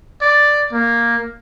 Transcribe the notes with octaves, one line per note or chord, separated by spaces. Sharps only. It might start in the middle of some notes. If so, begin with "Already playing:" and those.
D5
A#3